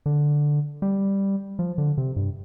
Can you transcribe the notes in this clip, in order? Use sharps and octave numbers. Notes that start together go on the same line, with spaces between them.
D3
G3
F3
D3
C3
G2